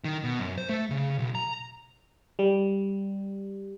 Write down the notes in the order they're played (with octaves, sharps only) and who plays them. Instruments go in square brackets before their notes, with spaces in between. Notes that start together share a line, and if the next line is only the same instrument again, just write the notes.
[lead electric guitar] D#3
B2
F#2
C5
A3
C#3
B1
A#5
[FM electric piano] G3